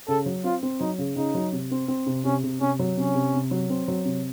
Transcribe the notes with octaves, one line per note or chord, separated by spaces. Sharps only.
C#3 A4
F#3
C4 F4
C4
F#3 D#4
C#3
C#3 D#4
F#3
C3
C4
C4
C3
C3 C#4
C3
C3 C#4
F#3
C3 C#4
C3
C3
F#3
C4
F#3
C3